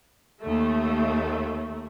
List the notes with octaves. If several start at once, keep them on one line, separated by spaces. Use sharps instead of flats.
D#2 A3